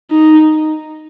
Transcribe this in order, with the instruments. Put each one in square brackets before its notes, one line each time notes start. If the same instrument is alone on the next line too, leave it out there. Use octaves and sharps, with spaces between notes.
[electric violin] D#4